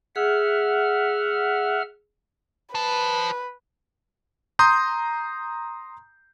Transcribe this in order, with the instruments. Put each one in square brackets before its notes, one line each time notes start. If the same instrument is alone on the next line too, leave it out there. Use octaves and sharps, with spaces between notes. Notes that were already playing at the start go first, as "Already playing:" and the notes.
[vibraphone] G#4 [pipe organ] E5 F#5 F6
[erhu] B4 [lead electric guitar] C5 A5
[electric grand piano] A#5 C6 D#6 G6